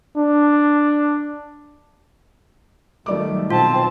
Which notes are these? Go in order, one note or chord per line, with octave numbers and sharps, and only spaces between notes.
D4
D#3 F#3 G3 A3 D5 D6
B2 C4 F4 A5